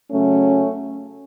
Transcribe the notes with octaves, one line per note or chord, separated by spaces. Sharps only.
C#3 F#3 A3 C#4